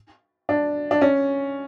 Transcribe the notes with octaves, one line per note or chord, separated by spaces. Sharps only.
D4
D4
C#4